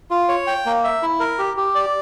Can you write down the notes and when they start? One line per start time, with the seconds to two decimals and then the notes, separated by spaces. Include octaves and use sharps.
0.11 F4
0.29 C#5
0.47 G5
0.66 A#3
0.84 E5
1.03 E4
1.20 A#4
1.39 G4
1.57 G4
1.75 D5